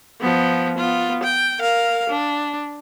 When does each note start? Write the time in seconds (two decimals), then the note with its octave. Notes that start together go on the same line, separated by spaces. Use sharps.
0.21 F3 B3
0.78 B3 F4
1.23 G5
1.60 A#4 F5
2.10 D4